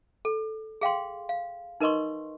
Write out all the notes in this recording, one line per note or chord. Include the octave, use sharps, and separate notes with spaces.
A4
G#4 F5 G5 C6
F5
D#4 A#4 B4 D#5 C6 C#6